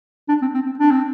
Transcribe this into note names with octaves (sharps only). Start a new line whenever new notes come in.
D4
C4
C4
C4
D4
C4